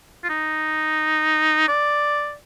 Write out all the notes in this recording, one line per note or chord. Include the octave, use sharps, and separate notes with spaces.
F4
D#4
D5